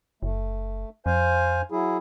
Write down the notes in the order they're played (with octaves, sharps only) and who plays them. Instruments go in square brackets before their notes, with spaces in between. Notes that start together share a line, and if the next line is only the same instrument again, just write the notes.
[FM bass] F#1 [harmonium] A3
[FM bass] F2 [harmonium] C5 F5 G#5
[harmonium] F#3 E4 G#4